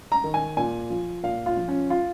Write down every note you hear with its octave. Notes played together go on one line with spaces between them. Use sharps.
A#5
D#3
G#5
A#2 G#5
F3
A#2 F5
F4
F3
C#4
F4